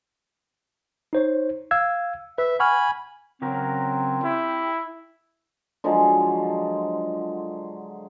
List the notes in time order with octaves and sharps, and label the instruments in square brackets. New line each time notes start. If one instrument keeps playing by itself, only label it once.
[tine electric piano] D#4 C5 C#5
F5 E6 G#6
[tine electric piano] B4 [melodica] E5
[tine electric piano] F#5 C#6 F6 [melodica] G#5 B5
[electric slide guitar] C#3 F#3 A#4 [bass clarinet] C4
[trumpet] E4 [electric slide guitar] G4
[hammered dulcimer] D3 F3 F#3 G#3